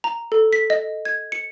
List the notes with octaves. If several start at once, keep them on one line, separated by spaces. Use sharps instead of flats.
A#5
A4
B6
D#5
G#6
C#7